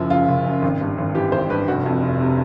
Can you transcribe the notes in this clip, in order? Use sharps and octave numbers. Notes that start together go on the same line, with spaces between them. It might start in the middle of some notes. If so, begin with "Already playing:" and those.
Already playing: F#1 F#2 F3 E4
C#3 F4
F#1
F#2
G#1
G2
G#1
E3 G4
G#1 C5
G2 B4
F1 F#4
F2
F1
C3